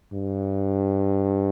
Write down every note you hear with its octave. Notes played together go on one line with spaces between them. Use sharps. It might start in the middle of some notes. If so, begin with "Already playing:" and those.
G2